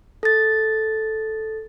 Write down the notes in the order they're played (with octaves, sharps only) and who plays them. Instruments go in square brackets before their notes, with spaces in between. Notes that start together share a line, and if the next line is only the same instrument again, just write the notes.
[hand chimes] A4 A6